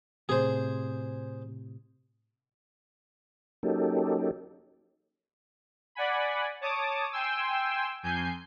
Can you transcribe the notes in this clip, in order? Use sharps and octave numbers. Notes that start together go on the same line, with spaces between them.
A2 C3 G#4 C5
F#3 A#3 C#4 D#4 G4 A4
D5 F#5 G#5 B5
C#5 A5 D6 D#6
G5 G#5 C6 E6
F2 G#5 G6 C7